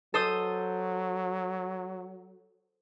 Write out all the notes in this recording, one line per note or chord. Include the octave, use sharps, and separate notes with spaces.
F#3 A4 C5 D#6